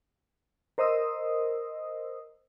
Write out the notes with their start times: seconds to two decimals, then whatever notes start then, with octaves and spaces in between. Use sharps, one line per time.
0.78 A#4 C5 D#5 D#6 E6